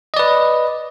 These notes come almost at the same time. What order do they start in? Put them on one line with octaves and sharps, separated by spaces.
D#5 D5 B4